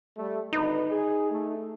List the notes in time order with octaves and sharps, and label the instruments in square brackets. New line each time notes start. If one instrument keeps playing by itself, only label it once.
[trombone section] G3 A3
[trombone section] G#1 D3 B4 [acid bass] D#4
[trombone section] G#4
A3